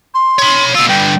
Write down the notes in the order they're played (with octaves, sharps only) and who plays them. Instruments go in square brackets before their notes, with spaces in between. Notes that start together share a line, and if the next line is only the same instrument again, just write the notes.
[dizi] C6
[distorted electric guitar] C#5 B5
[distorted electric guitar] B2 F4 [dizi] E6
[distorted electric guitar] G2 D3 [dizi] G5